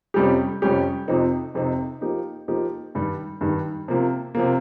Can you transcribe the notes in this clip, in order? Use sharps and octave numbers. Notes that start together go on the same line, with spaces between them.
F2 C3 G3 C#4 G4
F2 C3 G3 C#4 G4
F2 C3 F3 C4 D#4
F2 C3 F3 C4 D#4
F3 A#3 D#4 G4
F3 A#3 D#4 G4
G2 D#3 G3
G2 D#3 G3
C3 F3 A#3
C3 F3 A#3